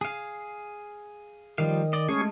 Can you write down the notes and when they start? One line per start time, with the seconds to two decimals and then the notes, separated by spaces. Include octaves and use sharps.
0.01 G#4 F5
1.58 D#3 F3 G3 F5
1.93 D5 D#5
2.09 G#3 A3 C#4 G#4